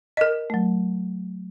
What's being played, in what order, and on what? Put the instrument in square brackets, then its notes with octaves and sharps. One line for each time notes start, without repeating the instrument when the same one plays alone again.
[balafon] A#4 D#5
[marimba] F#3 A3